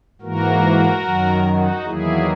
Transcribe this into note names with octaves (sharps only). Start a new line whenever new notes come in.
G#2 E3 A#3 F#4 A#4
F#2 D#3 F#3
D#4 F#4
E2 D#3 F#3 A#3 E4 G#4